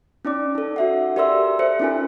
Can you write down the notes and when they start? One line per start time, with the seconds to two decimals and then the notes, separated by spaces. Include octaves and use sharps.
0.25 C#4 D#4 D5 D6
0.55 D#4 A4
0.76 F#4 E5 F#5
1.16 G4 A#4 D5 E5 C6 E6
1.59 A4 C5 E5 C#7
1.80 C#4 D#4 F4 A#4 G#5